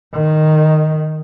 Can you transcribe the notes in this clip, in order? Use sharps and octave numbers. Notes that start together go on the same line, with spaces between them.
D#3